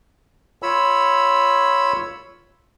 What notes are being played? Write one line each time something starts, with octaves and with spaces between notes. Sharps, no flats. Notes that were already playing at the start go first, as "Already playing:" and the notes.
F4 C#5 B5 E6